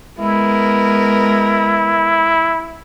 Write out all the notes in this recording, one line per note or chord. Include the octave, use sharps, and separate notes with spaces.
G#3 B3 E4 A#4